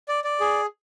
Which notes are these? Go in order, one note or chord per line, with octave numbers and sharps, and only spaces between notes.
D5
D5
G#4